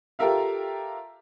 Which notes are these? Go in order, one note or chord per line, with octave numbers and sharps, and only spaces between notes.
F4 G4 A4 A#4 E5 F5